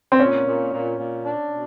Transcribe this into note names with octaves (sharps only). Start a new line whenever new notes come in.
C4
A#2 C#4
A#2
A#2
A#2
D4
B2